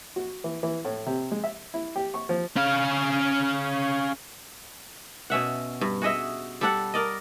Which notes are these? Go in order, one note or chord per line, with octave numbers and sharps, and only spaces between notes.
F#4
E3
E3
A2
C3
G#3
E5
E4
G4
C#6
F3
C#4 F5
B2 C#4 E5 F#5
G2
F#4 G#4 D#5 E5
G3 A4 F#5
A#4 D5 D#5